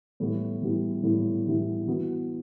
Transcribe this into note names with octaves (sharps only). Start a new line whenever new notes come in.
A2 E3 G3 B3 E4
A2 E3 G3 B3 E4
A2 E3 G3 B3 E4
A2 E3 G3 B3 E4
E3 B3 F#4